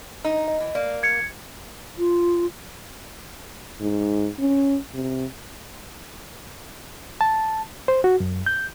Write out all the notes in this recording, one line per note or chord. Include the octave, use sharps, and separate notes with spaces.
D#4
D#5
E3
A#3 D5
G#6 C#7
F4
G#2
C#4
C3
A5
C5
F#4
F#2
G6